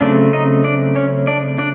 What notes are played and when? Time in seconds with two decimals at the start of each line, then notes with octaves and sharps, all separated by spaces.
0.01 C#3 F#3 A3 C4 D4 D5
0.33 D#4 D#5
0.64 D4 D5
0.95 C#4 C#5
1.27 D4 D5
1.58 D4 D5